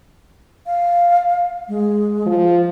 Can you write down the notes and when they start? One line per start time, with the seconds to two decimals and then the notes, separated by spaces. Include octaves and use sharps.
0.66 F5
1.68 G#3
2.26 F3